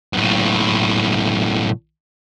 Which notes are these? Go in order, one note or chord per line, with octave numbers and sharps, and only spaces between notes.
B1 A2